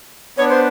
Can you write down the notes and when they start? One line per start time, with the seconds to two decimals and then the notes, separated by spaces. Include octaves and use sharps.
0.37 B3 D4 C#5
0.49 C5